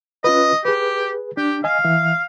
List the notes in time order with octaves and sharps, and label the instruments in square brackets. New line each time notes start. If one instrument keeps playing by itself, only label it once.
[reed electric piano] C#4 F4 B4 [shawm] D#5
[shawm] G4 [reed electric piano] G#4 B4
[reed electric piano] D4 [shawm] G4
[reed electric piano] D#5 G#5 [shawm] F5
[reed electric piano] E3 E5